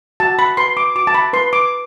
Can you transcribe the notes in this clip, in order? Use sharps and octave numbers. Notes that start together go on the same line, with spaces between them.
F#4 A5
B5
B4 C6
D6
F#4 D6
A5
B5
B4 C6
D6